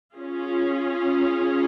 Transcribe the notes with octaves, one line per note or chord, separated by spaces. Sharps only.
C#4 F4 G#4